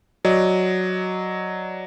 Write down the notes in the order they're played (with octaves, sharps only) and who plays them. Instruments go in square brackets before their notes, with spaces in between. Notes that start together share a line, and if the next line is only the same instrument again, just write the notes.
[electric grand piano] F#3 D5 D#5